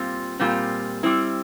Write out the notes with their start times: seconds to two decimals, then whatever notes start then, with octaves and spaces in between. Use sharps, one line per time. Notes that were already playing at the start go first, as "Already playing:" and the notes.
Already playing: A#2 G3 C4 F4
0.39 A#2 G3 C4 F4
1.03 G3 C4 E4